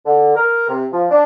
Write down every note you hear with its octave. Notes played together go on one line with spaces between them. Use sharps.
D3
A#4
C3
F3
D4